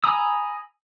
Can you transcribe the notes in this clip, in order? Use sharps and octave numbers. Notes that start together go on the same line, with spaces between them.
G#5 A#5 B5 D#6 E6